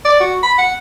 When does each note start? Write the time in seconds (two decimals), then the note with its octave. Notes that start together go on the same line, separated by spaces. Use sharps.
0.05 D5
0.20 F#4
0.43 B5
0.58 F#5